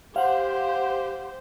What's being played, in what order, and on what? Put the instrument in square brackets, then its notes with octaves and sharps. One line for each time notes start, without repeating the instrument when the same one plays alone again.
[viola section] G4 C5 [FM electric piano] F5 F#5